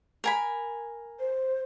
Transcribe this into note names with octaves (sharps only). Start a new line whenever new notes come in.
A#4 G#5 B5
C5